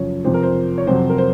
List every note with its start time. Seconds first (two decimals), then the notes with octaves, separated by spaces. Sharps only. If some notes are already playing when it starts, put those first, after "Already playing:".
Already playing: F#2 C#3 F3 C#5
0.24 F2 C3 F3 C5
0.34 A#4
0.43 C5
0.78 C#5
0.87 F2 C3 F#3 C5
1.10 A#4
1.18 C5